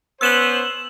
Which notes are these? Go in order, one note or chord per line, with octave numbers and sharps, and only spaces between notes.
B3 C#4 C5 E6 E7 F#7